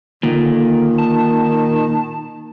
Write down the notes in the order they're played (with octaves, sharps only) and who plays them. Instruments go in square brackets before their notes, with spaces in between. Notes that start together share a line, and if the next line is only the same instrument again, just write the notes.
[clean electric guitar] A#2 [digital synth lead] D3 [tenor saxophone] D#3
[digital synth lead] A5